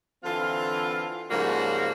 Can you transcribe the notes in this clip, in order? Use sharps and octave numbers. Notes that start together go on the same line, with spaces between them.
D3 E3 C4 F4
G#2 C#3 F3 G3 A#3 F#4